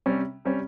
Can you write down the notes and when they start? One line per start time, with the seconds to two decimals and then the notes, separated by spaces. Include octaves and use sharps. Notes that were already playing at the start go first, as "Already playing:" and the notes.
0.06 C3 G3 C#4
0.45 C3 G3 C#4